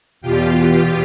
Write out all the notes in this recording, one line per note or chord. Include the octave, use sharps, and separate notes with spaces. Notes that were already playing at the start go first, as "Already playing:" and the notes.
E2 B2 F4 G4